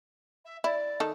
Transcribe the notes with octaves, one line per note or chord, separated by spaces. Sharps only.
E5
E4 D5
D#3 D#4 A4